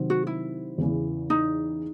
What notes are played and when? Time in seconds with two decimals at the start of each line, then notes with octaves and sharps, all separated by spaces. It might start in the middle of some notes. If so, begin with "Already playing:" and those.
Already playing: C3 D#3 F#3 C4
0.10 F#4
0.27 E4
0.78 E2 C#3 E3
1.30 D#4